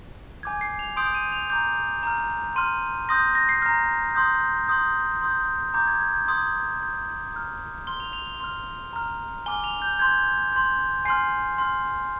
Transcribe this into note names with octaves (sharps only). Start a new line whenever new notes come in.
G#5 D6 G6 G#6
C7
F7
C6 D#6 G6 D7
D#7
F7
A#5 D6 G6
A#5 F6
C6 F6 D#7
C6 D#6 G6 A#6
A#6
C7
A#5 F6 A#6
C6 D#6 G6
C6 D#6 G6
C6 D#6 G6
A#5 D6 G6
G#6
G#6
G6
C6 D#6 G6 G#6
C6 G6
A#5 F6
C6 F6 G7
F7
F7
G7
C6 F6
A#5 F6
G#5 D6 F6 G7
F7
G6
C6 G6 G#6
C6 G6
G#5 C6 F6 C7
C6 F6